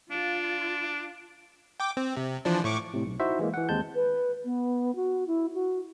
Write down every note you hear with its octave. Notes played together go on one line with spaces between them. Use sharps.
D4 F4
G5 D6
C4
C3
E3 F3 D4
A2 C#6 D6
A2 C3
B1
D#4 E4 F#4 C5 E5
E3 G#3 A#3
E3 F#5
D#2 G#3 C4 A5 G6
B4
B3
F#4
E4
F#4